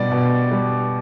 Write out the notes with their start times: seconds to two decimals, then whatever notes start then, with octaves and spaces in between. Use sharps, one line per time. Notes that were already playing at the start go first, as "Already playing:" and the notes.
Already playing: B2 G3 D5
0.11 B2
0.51 G3